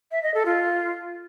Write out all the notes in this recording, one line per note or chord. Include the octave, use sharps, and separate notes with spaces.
E5
D#5
A4
F4